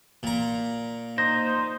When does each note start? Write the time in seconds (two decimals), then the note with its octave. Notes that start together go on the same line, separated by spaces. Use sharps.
0.23 A#2 A#5
1.18 D#4 C5 A#6